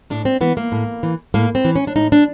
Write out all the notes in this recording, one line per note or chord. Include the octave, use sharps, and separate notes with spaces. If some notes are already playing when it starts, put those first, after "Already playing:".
A2 D4
C4
E3 B3
A#3
A2
E3
A2 A#3
C4
E3
C#4
D4
A2 D#4
D4